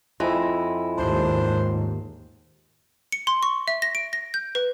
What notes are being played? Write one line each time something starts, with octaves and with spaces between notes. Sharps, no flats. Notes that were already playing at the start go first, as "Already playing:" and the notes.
F2 E4 F4 D#5 G#5
D#2 G#2 D4 C5
C#7
C6
C#6
E5
A#6
D7
A#6
G6
B4